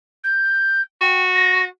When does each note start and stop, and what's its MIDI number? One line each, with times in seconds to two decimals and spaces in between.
0.24 0.81 91
1.01 1.65 66
1.01 1.22 79
1.35 1.63 94